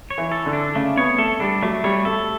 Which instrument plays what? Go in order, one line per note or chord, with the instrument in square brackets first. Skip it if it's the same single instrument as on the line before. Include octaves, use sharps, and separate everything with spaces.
[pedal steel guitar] C#5
[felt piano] E3
[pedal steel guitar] A4
[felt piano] D3
[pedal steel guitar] D4
[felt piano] C#3 [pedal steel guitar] A3
[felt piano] B3 [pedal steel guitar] C#5
[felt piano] A3 [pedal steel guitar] A4
[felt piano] G3 [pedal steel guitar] D4
[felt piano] F#3 [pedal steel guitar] A3
[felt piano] G3 [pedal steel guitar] C#5
[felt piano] A3 [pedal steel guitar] A4